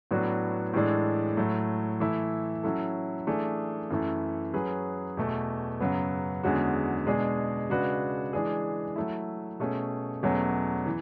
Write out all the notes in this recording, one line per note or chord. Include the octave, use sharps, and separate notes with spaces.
A2 F#3 B3 D4 F#4
A2 E3 G#3 D4 A4
A2 F#3 A3
E3 A3 E4
F#3 C#4 E4 A4
E3 A3 D4 G#4
F#2 E3 A3 E4
F#3 C#4 G#4 B4
E2 B2 A3
F#2 C#3 F#3 B3
E2 D3 G#3 C#4 F#4
B2 G#3 D4 G#4
C#3 G#3 D4 F#4 B4
E3 G#3 D4 G#4
F#3 A3 E4
B2 A3 C#4 G#4
E2 B2 F#3 A3 C#4
E3